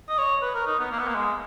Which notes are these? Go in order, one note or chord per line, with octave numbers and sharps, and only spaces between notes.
D#5
C#5
B4
A#4
D#4
B3
A#3
B3
A#3
G#3